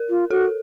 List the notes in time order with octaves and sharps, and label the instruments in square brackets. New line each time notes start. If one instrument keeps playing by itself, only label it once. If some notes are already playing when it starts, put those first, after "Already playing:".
Already playing: [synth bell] A#4
[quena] F4
[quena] F#4 [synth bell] A4